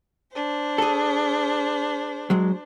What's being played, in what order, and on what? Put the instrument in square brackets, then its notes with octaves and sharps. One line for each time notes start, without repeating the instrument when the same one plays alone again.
[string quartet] D4 C5
[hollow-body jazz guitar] G#4 A4
F#3 G#3